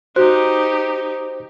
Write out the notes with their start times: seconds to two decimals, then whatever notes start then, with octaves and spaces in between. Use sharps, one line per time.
0.16 D#4 F#4 G4 C5